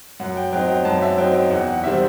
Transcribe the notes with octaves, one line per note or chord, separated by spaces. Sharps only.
F#2 F#5
G5
F#3 C4 D#4 G5
G5
F#2 A5
E5
F#3 C4 D#4 G5
G5
E2 F#5
F#5
C3 D#3 G3 C4 E5